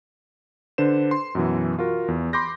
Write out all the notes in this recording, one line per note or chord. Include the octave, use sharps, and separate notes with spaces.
D3 D4 B4 C5 E7
C6
F#2 B2 E3
F4 F#4 A#4
E2
B5 C6 D6 G6 A#6